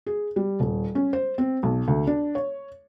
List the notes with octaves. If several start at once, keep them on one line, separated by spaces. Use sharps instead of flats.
G#4
G3
D#1
C#4
C5
C4
B1
D2
D4
C#5